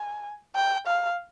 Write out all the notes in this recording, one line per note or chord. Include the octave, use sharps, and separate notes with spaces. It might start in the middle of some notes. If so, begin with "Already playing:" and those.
Already playing: G#5
G5
F5